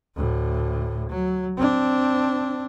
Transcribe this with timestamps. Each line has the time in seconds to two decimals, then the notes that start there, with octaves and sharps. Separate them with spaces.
0.16 D2 A2
1.09 F#3
1.57 C4 D4